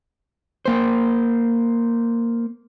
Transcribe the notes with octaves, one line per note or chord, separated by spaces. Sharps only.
A#3 C5